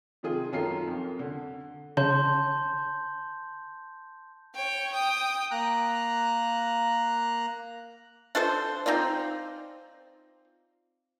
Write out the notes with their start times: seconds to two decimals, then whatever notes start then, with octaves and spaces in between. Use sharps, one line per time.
0.23 C3 D#3 F4 G#4
0.52 F#2 D#3 F4 A4 A#4 C7
0.88 F2
1.19 D3
1.97 C#3 A5 C6 G6
4.55 C#5 G5
4.93 G5 D#6
5.51 A#3 A#5 F#6
8.35 D4 F4 A4 C5
8.86 C4 D#4 F4 D5